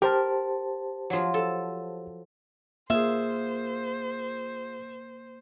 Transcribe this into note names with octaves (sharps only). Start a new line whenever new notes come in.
G4 A#4 C5 A5
F3 F#3
A4
A#3 F4 G#4 C5 E5